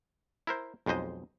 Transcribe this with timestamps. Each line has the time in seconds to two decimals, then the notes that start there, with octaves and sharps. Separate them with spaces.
0.47 E4 A#4 C5
0.86 B1 F2 G#3 C5 D#5